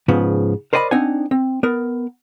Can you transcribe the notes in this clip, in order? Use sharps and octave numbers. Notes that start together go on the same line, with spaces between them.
G#2 C#3 F3 B3
A#4 C5 D5 D#5 F#5 B5
C4 D4 D#4 F#5 G#5
C4
B3 A#4